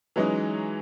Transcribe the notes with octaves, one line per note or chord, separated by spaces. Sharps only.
E3 F#3 G#3 C#4 D#4